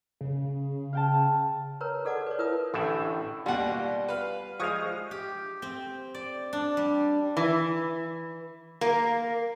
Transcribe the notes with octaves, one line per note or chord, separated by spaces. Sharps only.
C#3
F5 G5 A5
A#4 B4 C#5 A#5
G#4 A4 D5 F#5 A5 D6
B4 C#5
E4 A#4 B4 E5 A5 D#6
A1 A2 D3 E5
D#2 B2 G3 F4 F#5
B4 F5
F3 G#3 F5 C#6 D#6
G4
C4
D5
D4
G3
E3
A#3